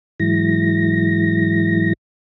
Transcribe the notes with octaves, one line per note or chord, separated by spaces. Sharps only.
G#2 E3 F#3 G#3 E4 A#6